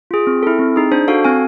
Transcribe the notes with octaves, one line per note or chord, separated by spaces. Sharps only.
F4 G#4
C4
E4 A4
C4
D#4 G#4
D4 C5
F#4 A4 F5
C4 G#5